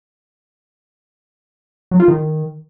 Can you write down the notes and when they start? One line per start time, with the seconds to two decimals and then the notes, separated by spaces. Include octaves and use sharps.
1.91 F#3
2.00 F4
2.08 D#3